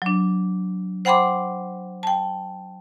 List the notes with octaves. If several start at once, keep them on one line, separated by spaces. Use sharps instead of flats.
F#3 D4
C5 F#5 G5 B5 C6 D6
G5 A5